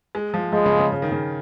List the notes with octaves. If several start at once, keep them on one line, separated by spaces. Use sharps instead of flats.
G#3
F3
F3 G#3
C#3
C#3
C#3
D#3
C#3